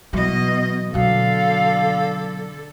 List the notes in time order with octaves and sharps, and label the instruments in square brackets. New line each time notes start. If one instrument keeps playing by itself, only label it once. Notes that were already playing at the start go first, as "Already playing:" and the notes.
[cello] B2 D#5 [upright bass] E3 F#3
[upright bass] B2 F#3 [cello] D3 A4 [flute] F5